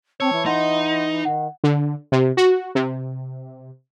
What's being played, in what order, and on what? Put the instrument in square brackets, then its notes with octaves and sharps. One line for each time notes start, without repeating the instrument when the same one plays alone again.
[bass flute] C4 [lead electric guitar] C#5 [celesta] A5 E6
[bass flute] E3
[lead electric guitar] D#4 [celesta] D#5 F#5 C6
[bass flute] D#3 [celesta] F#5
[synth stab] D3
C3
F#4
C3